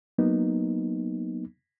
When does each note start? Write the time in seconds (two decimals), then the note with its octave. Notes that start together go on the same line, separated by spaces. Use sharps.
0.18 F#3 A#3 B3 D#4